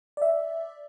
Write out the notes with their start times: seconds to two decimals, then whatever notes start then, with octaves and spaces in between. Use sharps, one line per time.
0.17 D5 E5